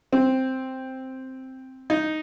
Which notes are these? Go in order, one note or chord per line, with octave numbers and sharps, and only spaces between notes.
C4
D#4